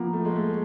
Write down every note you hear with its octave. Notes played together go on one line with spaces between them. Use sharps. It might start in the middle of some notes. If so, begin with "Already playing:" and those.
Already playing: F3 A#3 B3
A3
G#3
A3